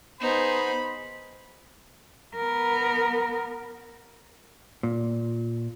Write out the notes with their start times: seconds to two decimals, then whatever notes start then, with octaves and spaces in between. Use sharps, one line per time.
0.21 B3 D#4 G#4 C5 B5
2.35 B3 A#4
4.83 A#2